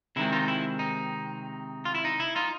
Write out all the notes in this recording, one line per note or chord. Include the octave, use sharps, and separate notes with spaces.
C3 D#3 G#3 C4 E4
D#4 F4
E4
D#4
F4
E4
D#4
E4
D#4 F4